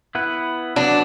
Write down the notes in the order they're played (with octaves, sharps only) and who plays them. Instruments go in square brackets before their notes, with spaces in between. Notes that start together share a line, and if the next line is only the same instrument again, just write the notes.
[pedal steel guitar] B3 E4 B4
[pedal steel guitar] F#3 B3 F#4 B4 [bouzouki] D4